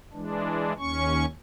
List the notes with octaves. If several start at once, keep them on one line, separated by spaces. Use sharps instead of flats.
E3 G#3 D4
D#2 C#4 C#6